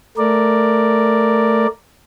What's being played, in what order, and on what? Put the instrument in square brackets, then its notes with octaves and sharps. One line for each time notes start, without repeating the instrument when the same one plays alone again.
[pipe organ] A3 A#4 D5